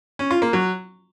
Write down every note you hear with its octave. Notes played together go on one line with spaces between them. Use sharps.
C#4
F4
A#3
F#3